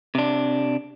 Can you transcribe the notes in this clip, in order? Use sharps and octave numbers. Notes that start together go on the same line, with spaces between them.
C3 D4